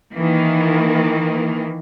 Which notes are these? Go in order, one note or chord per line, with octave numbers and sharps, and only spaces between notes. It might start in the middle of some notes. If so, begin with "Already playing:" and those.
D#3 E3 A#3